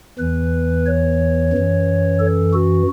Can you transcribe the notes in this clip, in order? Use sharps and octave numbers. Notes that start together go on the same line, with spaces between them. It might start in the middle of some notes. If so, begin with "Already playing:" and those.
E2 E3 B4
C#5
F#2 E3
A4
F#4